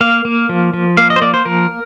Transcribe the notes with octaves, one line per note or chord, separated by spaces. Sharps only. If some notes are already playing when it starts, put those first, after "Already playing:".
A#3 F5
A#3
F3
F3
A#3 F5
D#5
C5
A#3 D5
C5
F3 A#4